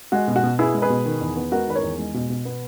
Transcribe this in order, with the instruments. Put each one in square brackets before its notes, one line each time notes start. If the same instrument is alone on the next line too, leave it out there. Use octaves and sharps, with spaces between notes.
[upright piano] G#3 F#4
B2
F#4
B2
B3 E4 G#4
G#3
G#4 B4
B2
D#3
E2
B3
G#3 F#4 A#4
D#3 B4
A#4 C#5
E2
G#3
B2
B2
B3